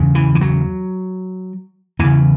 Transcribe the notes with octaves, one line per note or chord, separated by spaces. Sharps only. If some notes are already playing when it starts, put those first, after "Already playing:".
Already playing: E2 C#3
E3
E3
F#3
E2 C#3 E3